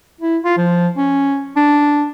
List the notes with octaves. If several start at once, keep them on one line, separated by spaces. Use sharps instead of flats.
E4
F4
F3
C#4
D4